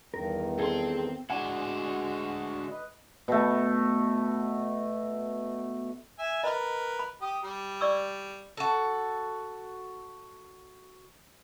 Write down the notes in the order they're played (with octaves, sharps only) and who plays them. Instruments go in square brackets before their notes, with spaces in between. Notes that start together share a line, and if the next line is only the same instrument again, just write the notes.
[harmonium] E2 G2 D#3 [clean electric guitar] A#4
[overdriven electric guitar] C4 C6 [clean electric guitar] G#4 A4
[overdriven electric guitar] D3 E4 [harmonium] G#3 F#4 [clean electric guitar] F#5 G#5
[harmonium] B4 D#5
[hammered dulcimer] B2 A3
[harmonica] E5 G#5
[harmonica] A#4 B4 [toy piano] D#5 B5
[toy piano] B5
[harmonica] G4 D#6
G3
[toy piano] D5 C#6 E6
[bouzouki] F#4 A4